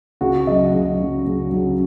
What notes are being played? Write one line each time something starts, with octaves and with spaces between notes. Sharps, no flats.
C#2 F#4
C#3 F#3 D#5
C#2
C#3 F#3
C#2
C#3 F#3